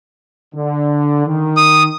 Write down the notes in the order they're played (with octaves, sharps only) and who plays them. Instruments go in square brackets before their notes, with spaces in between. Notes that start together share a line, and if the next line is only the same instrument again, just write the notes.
[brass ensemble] D3
D#3
[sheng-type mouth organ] D#6